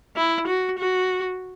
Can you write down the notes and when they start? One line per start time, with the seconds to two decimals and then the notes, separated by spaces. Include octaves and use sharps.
0.17 E4
0.47 F#4
0.79 F#4